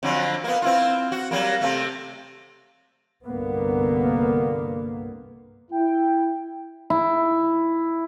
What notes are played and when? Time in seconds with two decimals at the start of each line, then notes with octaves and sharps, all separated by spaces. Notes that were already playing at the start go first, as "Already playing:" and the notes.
0.03 F2 D3 F#3
0.44 A#3 B3
0.62 C4 E4 F4
1.12 F#4
1.31 F#3 G3 A#3
1.61 C3 A3
3.25 C2 G2 D3 A#3 B3
5.71 E4 G5
6.90 E4